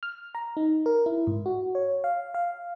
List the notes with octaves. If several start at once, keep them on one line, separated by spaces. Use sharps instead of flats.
F6
A#5
D#4
A#4
E4
G#2
F#4
C#5
F5
F5